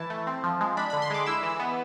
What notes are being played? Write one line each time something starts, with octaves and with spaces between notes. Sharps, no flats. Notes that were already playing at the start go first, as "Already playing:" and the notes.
Already playing: E3 E4 A5
A3
C4
F3
G#3
D4 B5
D3 B5
C6
G#3 D6
E4 E6
E3
B3